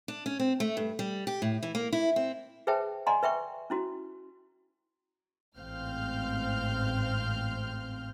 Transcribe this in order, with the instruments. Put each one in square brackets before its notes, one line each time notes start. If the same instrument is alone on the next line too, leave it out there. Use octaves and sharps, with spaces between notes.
[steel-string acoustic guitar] D4
C#4
C4
A3
G2
G3
G4
A2
E3
A#3
E4
C4
[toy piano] G#4 B4 C5 E5 G5 A5
D5 D#5 F#5 G#5 A#5 C6
B4 E5 G5 C#6
C#4 E4 F#4
[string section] A1 G#2 C4 F5 F6 G6